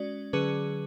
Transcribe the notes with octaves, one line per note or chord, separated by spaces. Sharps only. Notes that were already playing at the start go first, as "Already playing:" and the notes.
Already playing: G#3 C#4 F#4 D5
D3 F#3 C#4 G#4 B4